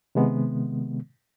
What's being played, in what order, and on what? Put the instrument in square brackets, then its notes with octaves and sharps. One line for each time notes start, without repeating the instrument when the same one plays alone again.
[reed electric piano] C3 D#3 G#3 B3